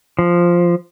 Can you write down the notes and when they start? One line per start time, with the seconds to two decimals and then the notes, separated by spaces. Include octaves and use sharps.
0.19 F3